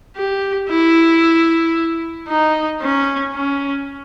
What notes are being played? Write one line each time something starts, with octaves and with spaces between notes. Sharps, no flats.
G4
E4
D#4
C#4
C#4